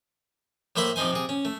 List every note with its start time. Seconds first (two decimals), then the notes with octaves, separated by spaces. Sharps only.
0.76 A2 A#3 C5 E5 B5 C#6
0.96 C3 F3 D#4 C5 G#5
1.13 C3 G#4
1.29 C#4
1.45 A3